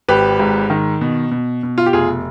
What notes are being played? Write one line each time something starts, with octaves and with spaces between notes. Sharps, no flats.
G#1 G4 B4
G#2
D#3
B2
B2
B2
F4
G4
F1 F4 G#4